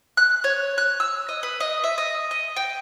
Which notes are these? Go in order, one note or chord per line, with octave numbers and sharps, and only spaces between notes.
F#6
C#5
F#6
E6
D#5
B4
D#5
E5
D#5
D#5
G5